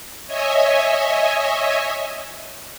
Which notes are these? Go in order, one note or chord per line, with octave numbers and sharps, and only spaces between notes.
C#5 D#5 E5 G#5